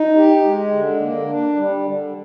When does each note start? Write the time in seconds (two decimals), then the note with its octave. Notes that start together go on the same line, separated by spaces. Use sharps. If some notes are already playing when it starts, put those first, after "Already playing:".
Already playing: D#4
0.16 G4
0.44 G#3
0.72 D3
1.00 A#3
1.28 D4
1.55 G3
1.83 D3